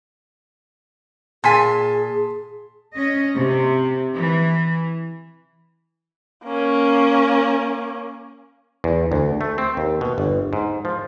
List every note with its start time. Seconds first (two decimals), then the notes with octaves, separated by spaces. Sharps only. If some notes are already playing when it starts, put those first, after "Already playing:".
1.44 A#2 G#4 G#5 A5 C6 B6
2.95 C#4 D#5
3.35 C3
4.16 E3
6.45 A#3 C#4
8.84 E2
9.12 D2
9.41 A3
9.58 C4
9.77 D#2
10.01 B2
10.18 G1
10.53 G#2
10.85 F3